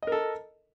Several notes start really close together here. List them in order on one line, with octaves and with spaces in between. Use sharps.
D#5 A#4 A4